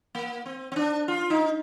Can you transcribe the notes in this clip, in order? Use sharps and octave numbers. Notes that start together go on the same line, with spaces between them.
A#3
C4
C4
D4
F4
D#4